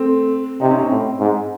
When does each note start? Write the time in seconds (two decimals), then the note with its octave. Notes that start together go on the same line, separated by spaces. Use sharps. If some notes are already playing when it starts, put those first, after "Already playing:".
Already playing: A3 C4
0.61 C3 D#4
0.70 C#4
0.81 C4
0.91 A2
1.20 G#2